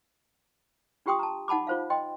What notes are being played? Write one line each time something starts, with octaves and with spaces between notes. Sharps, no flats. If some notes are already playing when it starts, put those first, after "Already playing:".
D4 F4 G4 G5 C6 D#6
A5 A#5
D#4 F#5 A5 B5 D6
F4 C5 F5
D#5 G5 C6